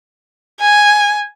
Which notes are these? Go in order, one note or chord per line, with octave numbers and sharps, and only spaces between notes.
G#5